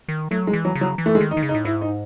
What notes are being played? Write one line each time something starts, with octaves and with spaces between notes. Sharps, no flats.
D#3
F#3 A3
G#3
E3
F#3
C#3
F#3
E3
A3
G#3
D#3
D#4
D#3
C#3
D#4
A2
G#2 E4
D#4